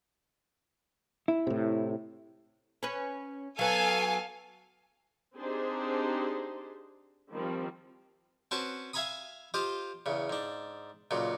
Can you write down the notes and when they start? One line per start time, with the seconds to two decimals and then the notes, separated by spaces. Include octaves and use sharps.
1.28 E4
1.47 A2 C3
2.83 C#4 B4
3.59 F#3 B3 A4 F5 G#5
5.38 C4 D4 D#4 G4 G#4 C5
7.31 D#3 F3 G3 C4
8.51 C4 C#4 F#4 B4 A5
8.93 E5 F5 G#5 A#5 B5 D#6
9.54 F4 G4 C5 D#5 F5
10.06 E2 C#3
10.30 G#2 D4
11.11 C#2 A#2 F#3